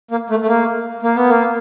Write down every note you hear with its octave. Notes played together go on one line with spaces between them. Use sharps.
A#3
A3
A3
A#3
A#3
B3
A#3